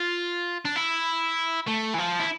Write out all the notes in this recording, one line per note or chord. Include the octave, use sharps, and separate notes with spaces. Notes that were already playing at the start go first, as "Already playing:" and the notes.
Already playing: F4
D4
E4
A3
E3
F3
E4